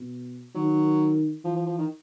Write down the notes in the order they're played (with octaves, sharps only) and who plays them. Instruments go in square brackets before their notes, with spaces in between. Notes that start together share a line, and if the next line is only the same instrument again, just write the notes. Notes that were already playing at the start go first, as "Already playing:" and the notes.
Already playing: [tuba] B2
[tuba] D#3 [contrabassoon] F#3
[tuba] E3 [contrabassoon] F3
[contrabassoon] F3
F3
D#3